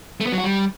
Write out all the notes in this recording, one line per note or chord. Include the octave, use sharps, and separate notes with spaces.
A3
B3
F#3
F#4
G3